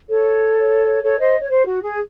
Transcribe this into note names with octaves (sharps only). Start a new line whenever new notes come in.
A4 C#5
A4 C#5
C5 D#5
C#5
C5
F#4
G#4